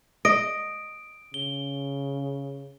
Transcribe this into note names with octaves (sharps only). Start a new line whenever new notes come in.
D#5 D7
C#3 G7